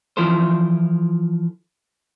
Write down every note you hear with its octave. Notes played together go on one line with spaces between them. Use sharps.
E3 F3 E4 F4 A4 C5